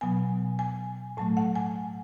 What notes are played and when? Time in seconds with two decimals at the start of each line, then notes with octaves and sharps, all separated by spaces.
0.01 B2 F#3 B3 G#5
0.59 G#5
1.17 A2 F#3 A3 A5
1.37 F#5
1.55 G#5